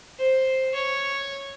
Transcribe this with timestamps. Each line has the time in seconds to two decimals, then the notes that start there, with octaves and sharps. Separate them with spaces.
0.19 C5
0.74 C#5